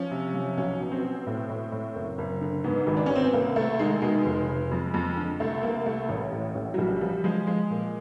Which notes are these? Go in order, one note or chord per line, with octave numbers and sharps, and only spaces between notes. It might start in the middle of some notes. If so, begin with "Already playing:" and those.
Already playing: F3 C#4
C3
F3
B1 C#4
B2
C4
B2
A2
A2
A2
F#1
F#1
D3
G#2 B3
G#1
D4
G#1 C#4
C4
B3
C2 A#3
C2 A3
D#3 G#3
B2 G#3
F1
F1
F2
F2
D3
C2 A3
C2 A#3
C2 A3
A1
A2
A1
F#3
A#1 G3
F3 G3
F3 G#3
F3 G#3
A#2